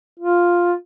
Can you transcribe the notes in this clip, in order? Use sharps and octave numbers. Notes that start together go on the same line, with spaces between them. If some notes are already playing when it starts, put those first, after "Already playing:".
F4